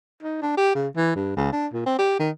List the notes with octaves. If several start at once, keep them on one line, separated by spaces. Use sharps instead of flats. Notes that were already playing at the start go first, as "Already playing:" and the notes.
D#4
D4
G4
C#3
E3
G2
C#2
D4
A#2
C4
G4
D#3